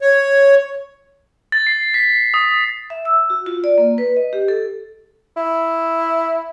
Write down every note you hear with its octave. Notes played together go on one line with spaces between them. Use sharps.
C#5
A6
C7
B6
D#6
E5
E6
F#4
F4
D5
A#3
B4
D#5
G4
A4
E4